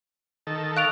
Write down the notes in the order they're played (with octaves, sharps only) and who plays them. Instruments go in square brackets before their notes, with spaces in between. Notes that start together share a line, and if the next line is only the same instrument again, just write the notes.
[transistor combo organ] D#3 A4
[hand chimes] F5 C#6 [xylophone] F#6 D7 F7